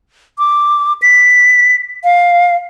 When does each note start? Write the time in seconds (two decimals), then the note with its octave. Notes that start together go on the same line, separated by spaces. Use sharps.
0.39 D6
1.02 B6
2.04 F5